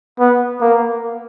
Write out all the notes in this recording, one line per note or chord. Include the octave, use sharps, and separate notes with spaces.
B3
A#3